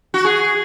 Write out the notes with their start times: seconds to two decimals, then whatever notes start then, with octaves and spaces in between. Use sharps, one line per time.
0.14 F#4
0.25 G#4